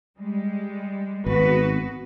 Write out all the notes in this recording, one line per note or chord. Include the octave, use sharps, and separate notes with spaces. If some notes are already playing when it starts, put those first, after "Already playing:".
G3 G#3
G#1 B3 F#4 B4